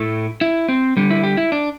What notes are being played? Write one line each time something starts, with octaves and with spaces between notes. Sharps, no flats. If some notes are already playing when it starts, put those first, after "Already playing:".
Already playing: A2 A3 E4
E4
C4
D3 G3
E4
G4
E4
D4